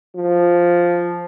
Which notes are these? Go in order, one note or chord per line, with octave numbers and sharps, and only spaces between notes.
F3